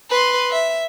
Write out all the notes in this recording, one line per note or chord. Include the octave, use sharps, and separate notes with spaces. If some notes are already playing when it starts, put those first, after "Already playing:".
B4 C6
E5